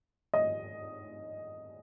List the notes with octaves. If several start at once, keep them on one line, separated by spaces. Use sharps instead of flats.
D#5